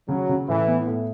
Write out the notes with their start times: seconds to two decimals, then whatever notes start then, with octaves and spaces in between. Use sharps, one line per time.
0.08 C#3 F#3
0.29 C#3
0.48 A2 E3
0.68 B3
0.87 A2